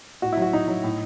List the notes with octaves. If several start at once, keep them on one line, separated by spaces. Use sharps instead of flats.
A2 F#4
E4
F#3 F#4
A2 D#4
F#3
A2